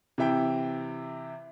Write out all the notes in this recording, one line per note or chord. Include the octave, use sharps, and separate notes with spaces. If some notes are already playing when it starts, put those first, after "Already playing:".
C3 E3 E5 G5